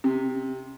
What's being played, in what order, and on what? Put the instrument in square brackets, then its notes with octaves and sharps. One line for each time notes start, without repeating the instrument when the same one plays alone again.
[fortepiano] C3